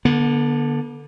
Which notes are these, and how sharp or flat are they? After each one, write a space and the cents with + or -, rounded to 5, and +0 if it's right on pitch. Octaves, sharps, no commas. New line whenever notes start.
D3 +0 B3 -40